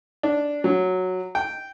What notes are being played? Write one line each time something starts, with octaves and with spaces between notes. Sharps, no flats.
D4
F#3
G5